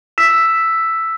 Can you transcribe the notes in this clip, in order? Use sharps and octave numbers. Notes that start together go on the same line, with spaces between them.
E6 B6 E7